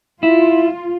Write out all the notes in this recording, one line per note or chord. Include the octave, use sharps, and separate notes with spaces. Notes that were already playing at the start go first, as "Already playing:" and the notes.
E4 F4